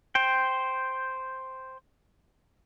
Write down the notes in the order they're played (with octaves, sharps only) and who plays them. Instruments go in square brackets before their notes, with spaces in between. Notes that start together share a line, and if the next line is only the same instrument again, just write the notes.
[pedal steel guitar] C5 G5